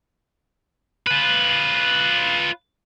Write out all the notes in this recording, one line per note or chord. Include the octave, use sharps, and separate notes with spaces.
F4 B4